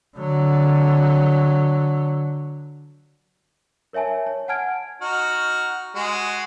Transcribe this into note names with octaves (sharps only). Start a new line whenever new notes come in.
D3 F#3
A#4 C#5 E5 G#5 A5
C#5
F#5 G#5 A5 F6 G#6 D7
D#4 F#4 F6
G#3 F#4